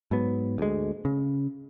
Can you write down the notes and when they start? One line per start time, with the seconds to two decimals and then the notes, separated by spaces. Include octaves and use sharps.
0.11 G#2 F#3 B3
0.58 D2 G#3
1.05 C#3